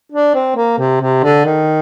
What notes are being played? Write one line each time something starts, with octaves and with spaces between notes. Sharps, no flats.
D4
C4
A#3
C3
C3
D3
D#3